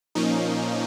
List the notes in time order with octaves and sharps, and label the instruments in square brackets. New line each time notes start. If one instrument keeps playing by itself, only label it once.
[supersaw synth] A#2 F3 A#3 C#4 D#4